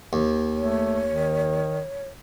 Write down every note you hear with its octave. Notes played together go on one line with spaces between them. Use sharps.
D#2
A3 C#5
D#3